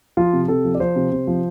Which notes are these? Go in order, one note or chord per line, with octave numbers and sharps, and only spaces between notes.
F3 F4
C3
C3 A4
F3
D5
F3 C5
C3
C3
F3